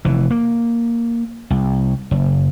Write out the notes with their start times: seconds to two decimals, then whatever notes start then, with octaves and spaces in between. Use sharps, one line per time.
0.05 F1 E3
0.30 A#3
1.50 C2
2.11 F#1